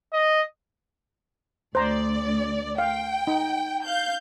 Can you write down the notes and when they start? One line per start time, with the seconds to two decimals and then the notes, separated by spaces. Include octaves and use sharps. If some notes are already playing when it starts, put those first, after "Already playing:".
0.13 D#5
1.75 D2 C5 D5 A#5
2.78 F5 G5
3.27 D#4
3.84 F5 G6